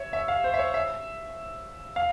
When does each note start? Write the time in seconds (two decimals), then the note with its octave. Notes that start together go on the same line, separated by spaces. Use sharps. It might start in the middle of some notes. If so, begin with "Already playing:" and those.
Already playing: C#5 E5
0.13 E5
0.28 F5
0.44 C5
0.54 E5
0.59 C#5
0.74 E5
1.96 F5